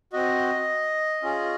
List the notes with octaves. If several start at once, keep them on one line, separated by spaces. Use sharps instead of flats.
C4 F#4 D#5
C#4 F4 G#4